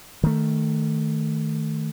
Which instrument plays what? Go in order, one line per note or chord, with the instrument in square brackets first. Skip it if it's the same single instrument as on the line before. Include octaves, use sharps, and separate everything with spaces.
[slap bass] D#3 A3